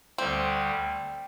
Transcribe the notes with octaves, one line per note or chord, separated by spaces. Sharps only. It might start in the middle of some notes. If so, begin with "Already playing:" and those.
D2 D3 G3 C4